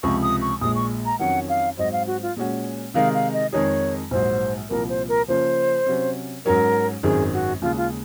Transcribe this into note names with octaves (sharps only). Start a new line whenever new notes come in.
C#2 C3 F3 C#6
D#6
C#6
A#1 A#2 G#3 D#6
C#6
A#5
F2 D#3 F#3 C#4 F#5
F5
G#2 F#3 C4 D#5
F5
F#4
F4
A#2 G#3 C#4 F#4
C3 D#3 G#3 D#4 A#4 F5
F5
D#5
F2 D#3 G#3 D#4 G#4 C#5
A#1 G#2 F#3 C5
C2 A#2 F3 A#4
C5
A#4
C#3 F3 A#3 C#4 F4 C5
C3 F#3 C#4
G#2 F#3 C#4 A#4
G#1 F#2 D#3 G#3 C4 G#4
F#4
D#2 C#3 G#3 F4
F4